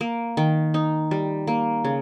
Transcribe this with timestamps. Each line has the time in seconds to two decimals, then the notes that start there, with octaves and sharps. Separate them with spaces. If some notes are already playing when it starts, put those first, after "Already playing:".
0.01 A#3
0.37 D#3
0.74 D#4
1.11 G3
1.47 A#3
1.84 C#3